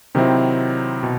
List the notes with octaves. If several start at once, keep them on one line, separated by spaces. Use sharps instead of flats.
C3 D#3 F#3 C4 E4
B2